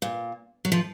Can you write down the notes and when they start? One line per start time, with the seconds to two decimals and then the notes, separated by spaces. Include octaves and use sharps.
0.02 A#2
0.65 F#3
0.72 F3